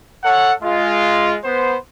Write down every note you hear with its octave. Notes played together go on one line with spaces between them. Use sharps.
A4 C#5 F#5
G#3 F4
B3 C5